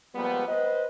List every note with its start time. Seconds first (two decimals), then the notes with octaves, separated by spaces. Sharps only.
0.15 F3 G3 G#3 A#3 B3
0.48 B4 C5 D#5